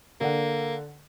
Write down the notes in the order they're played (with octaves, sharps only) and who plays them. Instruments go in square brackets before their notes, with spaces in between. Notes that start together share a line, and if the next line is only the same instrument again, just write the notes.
[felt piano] D3 F#5 [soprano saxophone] A#3